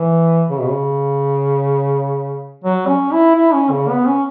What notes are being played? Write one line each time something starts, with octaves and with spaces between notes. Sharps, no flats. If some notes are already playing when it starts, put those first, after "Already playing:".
Already playing: E3
C#3
B2
C#3
F#3
C#4
E4
E4
C#4
C#3
B3
C#4